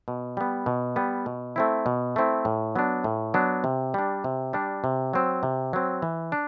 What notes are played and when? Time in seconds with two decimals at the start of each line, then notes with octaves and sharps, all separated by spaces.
0.08 B2
0.37 G3 B3
0.66 B2
0.96 G3 B3
1.26 B2
1.56 A3 C4 E4
1.86 B2
2.16 A3 C4 E4
2.45 A2
2.76 F#3 B3 D4
3.04 A2
3.34 F#3 B3 D4
3.64 C3
3.94 G3 D4
4.24 C3
4.53 G3 D4
4.84 C3
5.13 F#3 C4
5.43 C3
5.73 F#3 C4
6.02 E3
6.32 D4